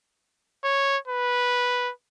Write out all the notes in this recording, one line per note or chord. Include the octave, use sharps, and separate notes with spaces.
C#5
B4